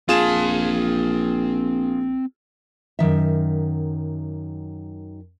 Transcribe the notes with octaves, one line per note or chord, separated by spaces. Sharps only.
A#1 C4 F4 G#4 A5 E7
F#2 D#3 E5